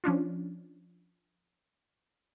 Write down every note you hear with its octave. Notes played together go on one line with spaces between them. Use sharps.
F3 C#4 D4 F4